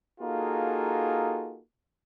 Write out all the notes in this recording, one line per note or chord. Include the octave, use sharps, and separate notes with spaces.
A#3 D#4 F4 F#4 G#4 A4